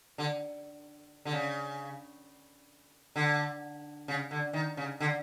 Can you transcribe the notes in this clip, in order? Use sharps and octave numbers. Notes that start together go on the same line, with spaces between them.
D3
D3
C#3
D3
C#3
D3
D#3
C#3
D3